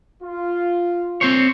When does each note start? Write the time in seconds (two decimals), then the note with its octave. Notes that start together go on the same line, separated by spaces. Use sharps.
0.22 F4
1.21 C4 C5 C#5